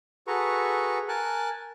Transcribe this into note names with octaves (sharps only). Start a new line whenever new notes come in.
F#4 G#4 A4 B4 A#5 C#6
A#4 G#5 A5 F#6